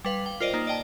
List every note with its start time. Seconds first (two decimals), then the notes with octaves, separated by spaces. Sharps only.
0.05 G3 B4 F5
0.26 G5
0.40 F4 A#4 C5 D5 D#5
0.54 A#3 D#4
0.67 D5 D#5 G5 A5